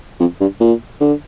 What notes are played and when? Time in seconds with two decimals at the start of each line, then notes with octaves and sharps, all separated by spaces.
0.19 F2
0.40 G2
0.60 A#2
1.00 D3